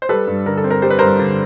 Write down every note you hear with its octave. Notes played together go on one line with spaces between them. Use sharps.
C5
G3 A4 B4
G2
D3 A#4
A4
C4
A#4
G3 C5
B4
G2 A#4 C5
D3